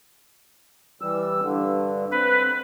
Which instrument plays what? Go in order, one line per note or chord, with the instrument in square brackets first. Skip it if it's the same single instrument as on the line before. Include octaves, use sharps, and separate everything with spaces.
[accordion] E3 G3 E6
G2 D3
[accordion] C4 [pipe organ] B4